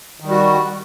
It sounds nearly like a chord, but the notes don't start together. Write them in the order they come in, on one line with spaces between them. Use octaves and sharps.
D#3 G3 F#4